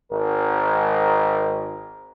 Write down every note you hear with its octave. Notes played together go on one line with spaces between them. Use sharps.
G#1 A#4